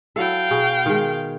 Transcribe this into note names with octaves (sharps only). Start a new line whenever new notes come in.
F#3 E4 A4 F5 G5
B2 G#4
D#3 G#3